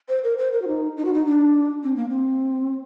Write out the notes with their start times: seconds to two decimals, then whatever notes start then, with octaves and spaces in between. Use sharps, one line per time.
0.09 C5
0.24 A#4
0.38 C5
0.53 A#4
0.62 F#4
0.68 D#4
0.97 D#4
1.05 F#4
1.14 D#4
1.26 D4
1.84 C4
1.97 A#3
2.09 C4